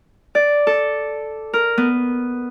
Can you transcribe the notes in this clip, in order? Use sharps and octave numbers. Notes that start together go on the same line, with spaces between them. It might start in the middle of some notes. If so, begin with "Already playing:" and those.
D5
A4
A#4
B3